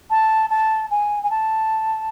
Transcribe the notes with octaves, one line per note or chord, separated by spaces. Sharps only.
A5
A5
G#5
G#5
A5